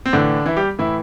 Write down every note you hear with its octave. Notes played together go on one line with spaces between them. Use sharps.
C4
A2 D3 E3 D4
E3 E4
G3 G4
A2 E3 E4